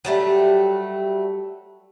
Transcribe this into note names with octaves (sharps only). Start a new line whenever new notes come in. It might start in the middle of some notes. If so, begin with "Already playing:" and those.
F#3 G3 A3